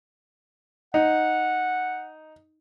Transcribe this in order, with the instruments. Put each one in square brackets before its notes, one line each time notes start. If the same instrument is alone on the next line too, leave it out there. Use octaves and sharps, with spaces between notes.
[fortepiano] D#4 [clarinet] F#5